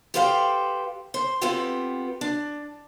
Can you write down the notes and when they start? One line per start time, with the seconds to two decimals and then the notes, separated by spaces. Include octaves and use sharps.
0.14 G4 A4 B4 C5 F5 G5
1.14 C5
1.41 B3 C4 F4 G4 A4 B4
2.21 D4